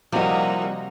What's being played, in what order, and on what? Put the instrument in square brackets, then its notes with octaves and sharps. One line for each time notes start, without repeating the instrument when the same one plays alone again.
[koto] C3 [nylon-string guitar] F3 E4 D#5 [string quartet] G3 A#3 D#4 [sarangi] F#4